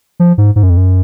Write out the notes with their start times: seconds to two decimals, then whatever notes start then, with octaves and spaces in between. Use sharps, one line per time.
0.20 F3
0.38 G#2
0.56 G#2
0.63 F#2
0.70 F2
0.77 F#2